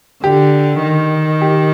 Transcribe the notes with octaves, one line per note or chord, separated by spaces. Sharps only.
D3 G4
D#3
G4